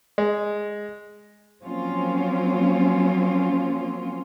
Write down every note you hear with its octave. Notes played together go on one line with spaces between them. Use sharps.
G#3
F3 F#3 A#3 C4 C#4 F4